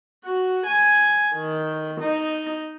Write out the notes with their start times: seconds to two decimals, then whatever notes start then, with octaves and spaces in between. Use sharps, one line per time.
0.25 F#4
0.66 G#5
1.35 D#3
2.01 D#4